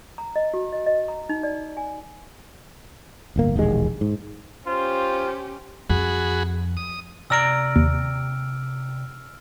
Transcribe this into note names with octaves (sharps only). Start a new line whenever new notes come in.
A#5
D#5
F#4
D#5
D#5
A#5
D#4
D5
G#5
D1 G1 A#3
E1 A#1 D#2 G#3
G#2
C#4 F4 G4 C5
F2 F#4 G#4 B5
D#6
C3 D5 A#5 E6 F6 D7
D#2